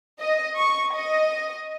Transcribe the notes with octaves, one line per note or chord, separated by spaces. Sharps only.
D#5
C#6
D#5